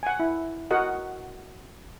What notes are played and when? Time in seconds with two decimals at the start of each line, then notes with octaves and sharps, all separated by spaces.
0.03 F#5 G#5
0.20 E4
0.71 F#4 A#4 D#5 F#5